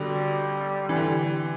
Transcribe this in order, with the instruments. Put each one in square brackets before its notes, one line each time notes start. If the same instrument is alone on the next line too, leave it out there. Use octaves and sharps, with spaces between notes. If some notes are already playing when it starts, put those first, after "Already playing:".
Already playing: [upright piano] B2 D3 [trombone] G3
[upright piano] E3
D3